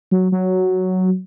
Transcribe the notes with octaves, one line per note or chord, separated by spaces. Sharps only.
F#3
F#3